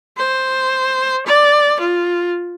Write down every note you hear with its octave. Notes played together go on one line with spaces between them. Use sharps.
C5
D5
F4